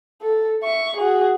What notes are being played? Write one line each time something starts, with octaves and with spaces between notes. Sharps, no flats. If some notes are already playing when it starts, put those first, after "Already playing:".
A4
E5 C#6
F#4 G#4